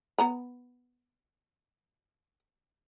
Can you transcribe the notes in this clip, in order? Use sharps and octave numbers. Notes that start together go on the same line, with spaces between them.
B3 A#5 B5